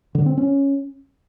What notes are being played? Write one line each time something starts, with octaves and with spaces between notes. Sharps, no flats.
D3
C4
C#4